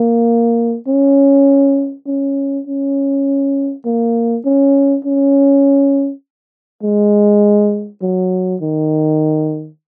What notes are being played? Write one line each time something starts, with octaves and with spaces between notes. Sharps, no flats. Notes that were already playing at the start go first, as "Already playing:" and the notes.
Already playing: A#3
C#4
C#4
C#4
A#3
C#4
C#4
G#3
F#3
D#3